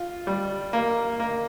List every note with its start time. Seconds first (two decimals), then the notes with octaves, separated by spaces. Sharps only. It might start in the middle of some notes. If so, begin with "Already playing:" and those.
Already playing: F4
0.27 G3
0.73 A#3
1.20 A#3